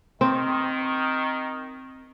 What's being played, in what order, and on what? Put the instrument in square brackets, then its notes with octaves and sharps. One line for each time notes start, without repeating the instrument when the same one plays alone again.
[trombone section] D#3 [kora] C4